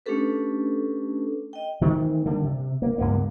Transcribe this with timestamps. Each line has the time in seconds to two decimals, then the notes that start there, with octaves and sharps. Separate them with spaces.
0.06 A3 C#4 D4 G4 A4 B4
1.53 D#5 G5
1.81 D#3 E3 A3 C4
2.25 D3 G3 A#3
2.44 C3
2.82 A#3
2.98 C#2 G2 A#3 B3